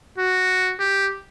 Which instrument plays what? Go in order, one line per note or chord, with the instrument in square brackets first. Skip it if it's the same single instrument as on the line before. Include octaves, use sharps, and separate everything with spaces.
[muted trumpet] F#4
G4